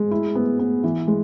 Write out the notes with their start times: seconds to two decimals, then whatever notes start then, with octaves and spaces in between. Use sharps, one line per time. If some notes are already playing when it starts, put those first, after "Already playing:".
Already playing: G#3
0.11 E4
0.35 B3
0.59 B3
0.84 E3
1.08 G#3